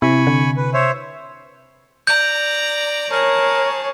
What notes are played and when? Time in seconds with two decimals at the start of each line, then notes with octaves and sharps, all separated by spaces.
0.02 C3 E4 G#5 B5 C#6
0.27 D3
0.57 B4
0.74 C5 C#5 E5
2.07 D5 A#5 G6
3.12 G#4 A#4 C#5 A5